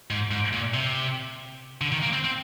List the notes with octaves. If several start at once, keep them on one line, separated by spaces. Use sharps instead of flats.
G#2
G#2
A#2
C3
D3
D#3
A#3
C4
C4